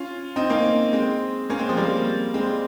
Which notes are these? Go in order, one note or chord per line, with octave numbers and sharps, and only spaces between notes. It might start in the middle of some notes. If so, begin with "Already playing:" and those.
Already playing: C#4 F4
C4 D#4
A#3 C#4
G#3 C4
A#3 C#4
G#3 C4
F3 G#3
G3 A#3
G#3 C4